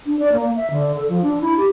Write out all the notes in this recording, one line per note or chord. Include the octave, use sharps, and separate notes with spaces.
D4
D5
A#3
E5
D3
A4
F3
D4
E4
G4